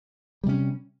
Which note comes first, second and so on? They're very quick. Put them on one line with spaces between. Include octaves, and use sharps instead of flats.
G3 C3 C#4